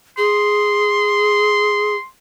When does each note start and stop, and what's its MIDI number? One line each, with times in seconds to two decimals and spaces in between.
0.18 1.96 68
0.18 2.05 84